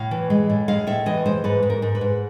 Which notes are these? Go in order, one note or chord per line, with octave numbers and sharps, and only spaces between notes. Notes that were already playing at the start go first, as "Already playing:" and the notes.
Already playing: A2 F5
E3
G#3
A2
G#3 F5
A2 E5
E3 D#5
G#3 C5
G#2 B4
G#2
A#4
G#2
B4
G#2